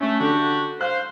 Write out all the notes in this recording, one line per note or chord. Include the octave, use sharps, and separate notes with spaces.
A3 C#4
D3 D4 F#4 G4
C5 F5 F#6